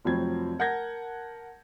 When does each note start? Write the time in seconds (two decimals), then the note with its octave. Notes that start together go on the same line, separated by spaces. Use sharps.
0.05 F1 F3 F#3 C4 B5 G#6
0.59 A#4 F#5 A5 G6 G#6 A#6